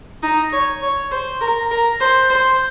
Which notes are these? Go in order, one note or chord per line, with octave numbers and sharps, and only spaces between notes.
D#4
C#5
C#5
C5
A#4
A#4
C5
C5